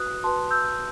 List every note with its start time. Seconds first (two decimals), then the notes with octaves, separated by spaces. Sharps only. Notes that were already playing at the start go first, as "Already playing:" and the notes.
Already playing: F#4 B4 D#6 F#6
0.24 F#4 B4 A5 C6
0.51 E6 G6